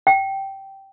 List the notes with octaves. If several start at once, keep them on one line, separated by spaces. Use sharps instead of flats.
G5